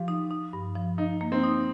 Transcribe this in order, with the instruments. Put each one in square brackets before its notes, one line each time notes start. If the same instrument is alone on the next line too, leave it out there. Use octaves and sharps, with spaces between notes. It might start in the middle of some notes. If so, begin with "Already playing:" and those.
Already playing: [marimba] F3 [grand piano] F4 G4
[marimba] D#4
D#4
G2
F3
[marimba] F3 [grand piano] D#4
[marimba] A#3
[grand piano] C4
[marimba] D#4